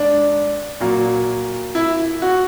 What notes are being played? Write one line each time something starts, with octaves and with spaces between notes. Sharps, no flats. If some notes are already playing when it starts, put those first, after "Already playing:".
Already playing: G#2 D4
A#2 F#3 A#3
E4
F#4